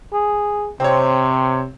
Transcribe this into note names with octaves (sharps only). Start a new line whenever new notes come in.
G#4
C3 C4 C#5